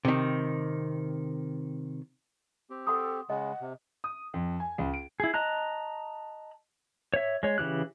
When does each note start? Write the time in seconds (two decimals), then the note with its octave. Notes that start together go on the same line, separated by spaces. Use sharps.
0.05 C3 D#3
2.70 C4 G4
2.87 A4 F#5 C6 D#6
3.30 C#3 G#3 D#5 F#5
3.61 C3
4.04 D#6
4.34 F2
4.60 G#5
4.78 C#2
4.94 D7
5.20 E4 G#4
5.34 D#5 A5 A#5 F#6
7.14 C#5 E5
7.43 G#3 C#5
7.58 C#3 E3 G4 F#6